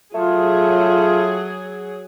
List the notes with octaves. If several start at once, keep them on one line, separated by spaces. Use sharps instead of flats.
F#3 A3 F4 G#4